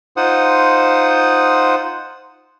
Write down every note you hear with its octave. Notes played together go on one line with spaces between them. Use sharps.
D#4 F4 C5 F#5 D#6